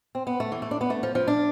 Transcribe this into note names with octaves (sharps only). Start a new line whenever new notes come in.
C4
B3
A3
E3
A3
D4
B3
A3
F3
F3
D4